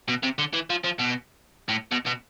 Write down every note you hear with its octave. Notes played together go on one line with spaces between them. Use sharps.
B2
C3
D3
E3
F3
F3
B2
A2
B2
B2